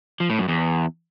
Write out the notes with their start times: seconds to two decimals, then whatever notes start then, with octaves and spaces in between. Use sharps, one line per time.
0.20 F3
0.30 A2
0.39 F#2
0.48 E2